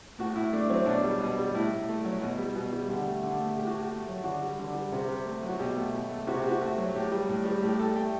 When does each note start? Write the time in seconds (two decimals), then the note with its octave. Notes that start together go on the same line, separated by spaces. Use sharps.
0.19 A2 F#4
0.35 A2 E4
0.53 A3 D4
0.69 F#3 C4
0.86 B2 D4
1.04 G3
1.21 B2
1.38 G3
1.54 A2 E4
1.71 A2
1.89 A3
2.05 F#3
2.22 B2
2.38 G3
2.56 B2
2.73 G3
2.89 D3 G4
3.07 A3
3.23 D3
3.40 A3
3.57 A2 G4
3.67 F#4
3.74 A2 G4
3.91 A3
4.08 F#3
4.24 D3 F#4
4.42 G3
4.59 D3
4.75 G3
4.92 C3
5.08 C3
5.26 A3
5.43 F#3
5.48 F#4
5.59 B2 G4
5.77 A3
5.94 B2
6.10 A3
6.27 C3 F#4
6.39 G4
6.44 C3
6.51 F#4
6.61 A3
6.78 F#3
6.94 A2 G4
7.12 G3
7.28 A2
7.45 G3
7.62 A2 G4
7.79 A2 A4
7.96 A3 G5